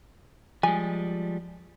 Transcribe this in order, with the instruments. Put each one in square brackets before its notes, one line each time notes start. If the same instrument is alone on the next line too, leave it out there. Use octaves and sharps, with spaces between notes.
[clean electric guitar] F3 G3 G#3 [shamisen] G#5